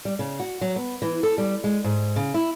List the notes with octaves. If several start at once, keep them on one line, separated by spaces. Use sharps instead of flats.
G3
C#3
F#4
F#3
B3
E3
A4
G3
G#3
G#2
C#3
E4